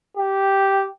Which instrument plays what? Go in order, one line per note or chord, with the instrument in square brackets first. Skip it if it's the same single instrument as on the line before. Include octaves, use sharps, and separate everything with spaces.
[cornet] G4